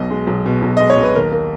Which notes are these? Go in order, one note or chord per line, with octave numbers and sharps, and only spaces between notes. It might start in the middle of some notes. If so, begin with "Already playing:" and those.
Already playing: B1 B2 D#5
G#3
B1
B2
B1
G#3 D#5
C#5
B1
B4
D#2 A#4
A#3